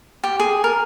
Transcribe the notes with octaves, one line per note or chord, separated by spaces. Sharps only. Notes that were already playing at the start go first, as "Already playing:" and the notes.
G4
G#4
A#4